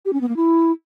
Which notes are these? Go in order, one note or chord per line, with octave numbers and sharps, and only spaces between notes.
G4
C#4
B3
A#3
E4